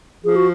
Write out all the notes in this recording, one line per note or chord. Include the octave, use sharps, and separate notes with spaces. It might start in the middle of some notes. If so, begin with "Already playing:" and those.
F3 G#4
F#4